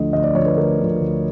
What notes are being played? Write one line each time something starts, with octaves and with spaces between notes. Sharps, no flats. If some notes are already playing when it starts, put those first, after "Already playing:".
Already playing: D2 D3 F3 D#5
D2 D#5
D5
D3 F3 C#5
B4
D2 A#4
D3 F3
D2